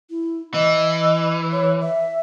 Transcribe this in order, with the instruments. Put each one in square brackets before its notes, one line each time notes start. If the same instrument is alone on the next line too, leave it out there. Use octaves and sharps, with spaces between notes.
[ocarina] E4
[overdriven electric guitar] E3 [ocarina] D#5
[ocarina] C#5
E5